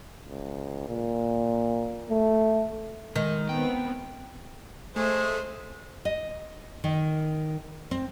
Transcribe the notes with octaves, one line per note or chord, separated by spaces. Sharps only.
C#2
A#2
A3
D#3 G#3
B3 C4 G5
G#3 A3 G#4 C5
D#5
D#3
C4